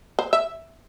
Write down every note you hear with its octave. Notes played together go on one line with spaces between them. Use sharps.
C5
E5